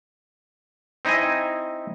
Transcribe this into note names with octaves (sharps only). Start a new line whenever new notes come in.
C4 D#4 E4 D#5 G#5